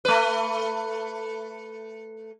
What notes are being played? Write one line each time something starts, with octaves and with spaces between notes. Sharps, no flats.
A3 B4